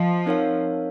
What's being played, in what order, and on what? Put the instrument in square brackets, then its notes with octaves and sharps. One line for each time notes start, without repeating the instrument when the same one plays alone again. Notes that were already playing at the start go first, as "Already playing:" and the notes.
Already playing: [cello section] F3 [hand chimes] D#5
[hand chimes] C4 D#4 A#4 C#5 F5